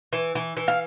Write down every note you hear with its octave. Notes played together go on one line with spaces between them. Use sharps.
E3
E3
E3
F5